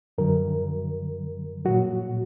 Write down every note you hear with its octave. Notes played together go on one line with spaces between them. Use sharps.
F#2 D3 F#3 A#4
A#2 F#3 F#4